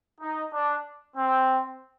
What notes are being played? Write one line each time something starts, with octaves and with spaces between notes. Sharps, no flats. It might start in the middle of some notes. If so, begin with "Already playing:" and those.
D#4
D4
C4